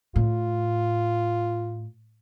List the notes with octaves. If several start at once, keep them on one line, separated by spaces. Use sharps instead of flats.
A2 F4